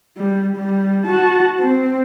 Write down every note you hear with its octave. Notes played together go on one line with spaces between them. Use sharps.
G3
G3
F#4 A5
C4